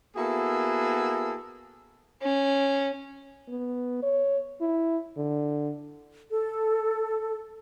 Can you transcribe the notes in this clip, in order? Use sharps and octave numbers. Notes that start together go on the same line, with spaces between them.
A#3 B3 E4 F#4 G#4 A4
C#4
B3
C#5
E4
D3
A4